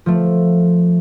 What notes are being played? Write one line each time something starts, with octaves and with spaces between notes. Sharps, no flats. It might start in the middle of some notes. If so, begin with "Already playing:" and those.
F3 A3